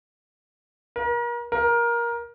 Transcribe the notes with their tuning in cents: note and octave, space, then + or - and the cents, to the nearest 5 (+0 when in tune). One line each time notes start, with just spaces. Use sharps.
A#4 +35
A#4 +15